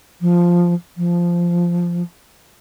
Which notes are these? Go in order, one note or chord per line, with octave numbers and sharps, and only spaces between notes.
F3
F3